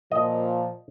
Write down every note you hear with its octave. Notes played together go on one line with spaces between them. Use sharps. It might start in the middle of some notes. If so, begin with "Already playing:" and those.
A#2 F3 D#5